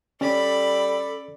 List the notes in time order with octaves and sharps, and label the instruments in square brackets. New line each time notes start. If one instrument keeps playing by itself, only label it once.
[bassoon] G3 [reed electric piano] C#4 [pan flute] A4 [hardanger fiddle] D5 B5